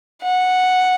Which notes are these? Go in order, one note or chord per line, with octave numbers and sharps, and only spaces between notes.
F#5